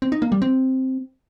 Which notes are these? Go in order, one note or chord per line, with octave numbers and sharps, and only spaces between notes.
C4
D#4
A#3
G3
C4